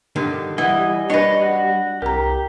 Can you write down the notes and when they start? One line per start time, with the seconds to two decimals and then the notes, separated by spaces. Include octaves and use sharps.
0.16 G2 D3 D#3
0.58 E3 G3 D#5 F#5 G#5
1.10 D4 D#4 B4 C#5 D#5 A#6
1.42 F#4
2.02 C2 G4 A#4 A#5